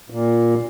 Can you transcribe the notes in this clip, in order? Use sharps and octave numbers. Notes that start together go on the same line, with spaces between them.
A#2